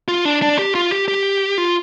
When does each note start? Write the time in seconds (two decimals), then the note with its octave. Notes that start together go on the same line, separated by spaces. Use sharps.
0.08 F4
0.25 D4
0.42 D4
0.59 G4
0.75 F4
0.92 G4
1.08 G4
1.58 F4